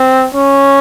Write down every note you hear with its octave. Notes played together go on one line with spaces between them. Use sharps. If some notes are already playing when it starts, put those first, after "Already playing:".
Already playing: C4
C#4